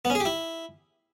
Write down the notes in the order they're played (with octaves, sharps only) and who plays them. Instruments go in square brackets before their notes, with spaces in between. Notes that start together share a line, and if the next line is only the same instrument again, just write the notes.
[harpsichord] B3
C#4
G#4
G4
E4